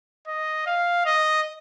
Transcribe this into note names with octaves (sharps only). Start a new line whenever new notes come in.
D#5
F5
D#5